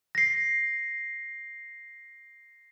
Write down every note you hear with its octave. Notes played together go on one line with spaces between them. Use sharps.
A#6 C7